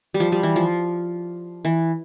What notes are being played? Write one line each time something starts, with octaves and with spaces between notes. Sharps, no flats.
G3
F3
G3
E3
F3
E3